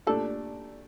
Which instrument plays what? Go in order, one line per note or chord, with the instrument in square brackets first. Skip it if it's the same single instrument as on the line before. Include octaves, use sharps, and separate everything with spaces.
[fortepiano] A#2 A3 D4 G4 D5 [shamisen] A4